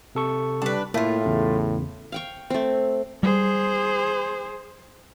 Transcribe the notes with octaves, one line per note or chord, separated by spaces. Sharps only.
C3 A4 C#6
G3 D4 B4
A2 A3 A#3 E4 F4
E2 C#3
F5 G5 C#6
A3 C4
G3 G#4 C5